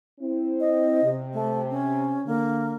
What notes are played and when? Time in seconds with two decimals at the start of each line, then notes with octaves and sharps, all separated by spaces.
0.19 C4 E4
0.60 D#5
1.02 C3
1.33 A3
1.70 C#4
2.26 D3 A#3